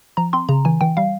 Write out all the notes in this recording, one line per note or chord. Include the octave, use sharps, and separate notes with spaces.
F3 A#5
C4 C6
C#3 A#5
E3 G#5
E3 G5
G3 F5